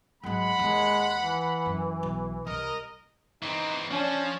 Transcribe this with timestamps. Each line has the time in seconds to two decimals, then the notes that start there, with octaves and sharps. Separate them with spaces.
0.24 G#1 F#3 G#3 F#5 B5
0.58 D#2 D#3 G#3
1.17 E3
1.66 F#2
2.03 B1
2.47 C2 A#4 D#5
3.43 E3 C4 D#4
3.91 F3 C#4 D4